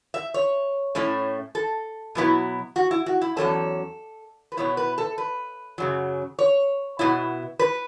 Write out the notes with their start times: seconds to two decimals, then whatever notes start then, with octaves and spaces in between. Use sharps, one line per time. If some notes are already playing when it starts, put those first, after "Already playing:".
0.14 E5
0.34 C#5
0.95 A2 A3 C#4 E4
1.55 A4
2.15 B2 F#3 B3 E4
2.76 F#4
2.91 E4
3.06 F#4
3.21 E4
3.36 E2 B2 F#3 C#4 A4
4.52 B4
4.57 B2 B3 E4 C#5
4.77 B4
4.98 A4
5.18 B4
5.78 F#2 C#3 F#3
6.39 C#5
6.99 B2 B3 E4
7.59 B4